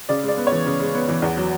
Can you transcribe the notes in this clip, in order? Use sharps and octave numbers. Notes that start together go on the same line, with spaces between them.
C#3 D5
G#3 D5
B3
E3 C#5
C#3
G#3
B3
E3
E2
F#3